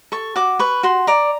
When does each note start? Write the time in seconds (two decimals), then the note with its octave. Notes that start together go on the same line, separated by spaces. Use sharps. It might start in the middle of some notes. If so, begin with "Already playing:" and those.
0.12 A4 C#6
0.36 F#4 D6
0.59 B4 C#6
0.83 F#4 C6
1.07 D5 A#5